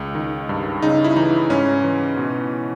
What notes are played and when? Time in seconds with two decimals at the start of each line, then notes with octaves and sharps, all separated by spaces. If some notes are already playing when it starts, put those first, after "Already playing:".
Already playing: C#2
0.15 D#3
0.49 G2
0.82 C#3 D#4
1.04 E4
1.16 E3 D#4
1.50 G#2 C#4
1.84 E3
2.17 B2